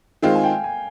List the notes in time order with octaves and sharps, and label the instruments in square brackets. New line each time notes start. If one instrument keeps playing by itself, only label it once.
[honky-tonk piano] D#3 G#3 C4 F4 [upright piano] F5
[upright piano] G#5
G5
G#5